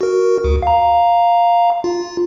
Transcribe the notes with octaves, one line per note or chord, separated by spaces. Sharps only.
F#4 A#4
D2
F5 A#5
F4